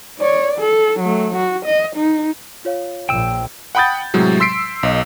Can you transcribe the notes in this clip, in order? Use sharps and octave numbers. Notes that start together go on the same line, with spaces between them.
C#5 D5
A4
F#3 A3
F#4
D#5
D#4
F4 C#5 F5
A#1 G5 E6
F#5 G5 B5 D#6 G6 A6
A2 C3 F#3 G#3
C6 E6 B6 C7 D7
B1 D#5